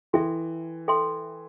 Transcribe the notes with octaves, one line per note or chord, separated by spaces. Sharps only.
E3 A4 E5 G5 C6
A4 E5 G5 C6